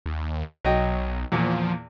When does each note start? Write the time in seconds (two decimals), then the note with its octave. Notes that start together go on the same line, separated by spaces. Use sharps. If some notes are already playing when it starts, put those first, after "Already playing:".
0.06 D#2
0.65 B1 F#3 D#5 G5
1.32 E2 A#2 F3